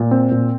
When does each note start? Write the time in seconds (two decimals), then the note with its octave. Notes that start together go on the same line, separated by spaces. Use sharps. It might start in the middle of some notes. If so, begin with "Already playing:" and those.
Already playing: A#2
0.11 C4
0.31 A#2